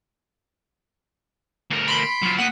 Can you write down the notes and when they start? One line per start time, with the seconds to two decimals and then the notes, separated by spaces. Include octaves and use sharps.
1.70 D2 A#4
1.88 B5 C6 D7
2.23 F#3 F4
2.38 A#3 D#5 F#5 B6